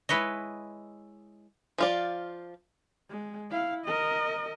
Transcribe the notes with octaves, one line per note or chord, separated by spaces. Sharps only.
G#3 E4 B4 C#5 D#5
F3 F4 D5
G#3
E4 F5
A#4 D#5